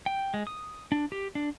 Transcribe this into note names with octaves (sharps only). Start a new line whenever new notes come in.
G5
G#3
D#6
D4
G4
D4